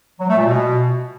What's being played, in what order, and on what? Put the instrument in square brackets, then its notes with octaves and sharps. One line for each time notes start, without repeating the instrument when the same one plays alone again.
[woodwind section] F#3
A3
A#2
B2